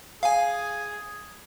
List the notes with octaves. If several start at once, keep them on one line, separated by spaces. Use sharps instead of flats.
G#4 F5 G#5